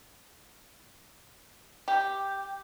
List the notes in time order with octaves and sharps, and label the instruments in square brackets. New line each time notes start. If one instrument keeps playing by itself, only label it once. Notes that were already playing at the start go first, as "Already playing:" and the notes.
[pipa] G4